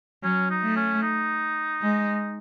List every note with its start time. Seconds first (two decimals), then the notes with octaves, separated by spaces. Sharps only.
0.23 F#3 C#4
0.50 D#4
0.62 A3
0.76 C#4
1.02 D#4
1.82 G#3